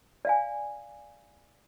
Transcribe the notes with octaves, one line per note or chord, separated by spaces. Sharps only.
D5 F5 G#5